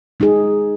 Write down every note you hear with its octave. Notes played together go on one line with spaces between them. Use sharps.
G#3 D#4 G#4